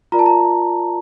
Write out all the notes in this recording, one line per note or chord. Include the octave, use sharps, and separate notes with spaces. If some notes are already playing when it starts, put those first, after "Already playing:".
F4 A#4 D5 A#5
A5
A#5